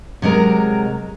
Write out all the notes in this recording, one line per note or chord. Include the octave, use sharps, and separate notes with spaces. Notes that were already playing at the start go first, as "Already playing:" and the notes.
C3 F#3 G#3 A#4